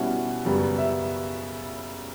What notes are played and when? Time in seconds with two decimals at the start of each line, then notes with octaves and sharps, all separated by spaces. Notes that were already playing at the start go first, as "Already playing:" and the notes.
Already playing: B2 G3 C#4 E4 F#5
0.45 F#2 C#3 G3 B3
0.78 E5